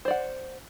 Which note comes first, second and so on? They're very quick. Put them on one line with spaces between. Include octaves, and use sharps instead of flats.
C5 D5 F#5